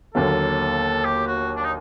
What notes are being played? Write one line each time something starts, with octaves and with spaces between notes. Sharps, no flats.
D#2 D3 F#3 A#3 A4
G4
F#4
D4
D#4